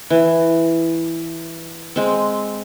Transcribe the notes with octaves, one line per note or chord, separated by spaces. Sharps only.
E3
G#3 C4